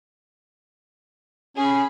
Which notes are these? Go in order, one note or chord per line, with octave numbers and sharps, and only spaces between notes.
C#4 G#4 B5